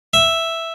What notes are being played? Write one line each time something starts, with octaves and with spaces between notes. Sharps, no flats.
E5